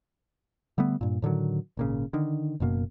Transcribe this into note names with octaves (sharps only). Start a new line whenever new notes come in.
D3 G3 A3 B3
G2 A#2
A2 D3 D#3 F#3
G#1 A#2 C#3
D3 D#3
F#1 F#2 B2 A#3